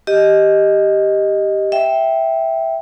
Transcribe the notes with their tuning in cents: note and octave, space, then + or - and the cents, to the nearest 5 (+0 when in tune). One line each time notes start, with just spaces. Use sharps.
G4 +0 D#5 +0
E5 +0 G5 +0